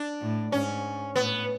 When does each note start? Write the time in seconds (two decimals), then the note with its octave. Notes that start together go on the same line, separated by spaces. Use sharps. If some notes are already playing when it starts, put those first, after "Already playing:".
Already playing: D4
0.21 A2
0.52 G#2 C#4
1.16 A2 B3